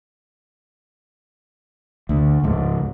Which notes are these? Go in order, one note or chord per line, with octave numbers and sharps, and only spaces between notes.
D2
C#2 G#2